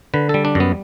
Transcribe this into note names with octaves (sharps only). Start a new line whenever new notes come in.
D3 B4
G3 A4
D4
F#2 B3